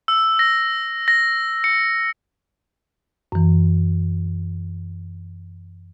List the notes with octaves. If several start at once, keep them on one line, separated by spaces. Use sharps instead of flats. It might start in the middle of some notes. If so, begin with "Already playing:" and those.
E6
A#6
A#6
C#7
F#2 E3